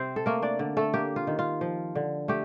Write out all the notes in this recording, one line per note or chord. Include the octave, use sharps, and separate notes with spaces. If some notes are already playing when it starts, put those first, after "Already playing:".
Already playing: C3 C4 C5
A4
A3 A#3 A#4
D4 D5
D3
A3 A4
A#3 G4
F4
D#3
F4
F3
D3
A3 G4